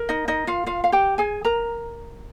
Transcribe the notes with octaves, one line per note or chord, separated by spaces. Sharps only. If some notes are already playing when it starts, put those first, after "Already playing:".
Already playing: A#4
D#4 D#5
D#4 D#5
F4 F5
F4 F5
F5
G4 G5
G#4 G#5
A#4 A#5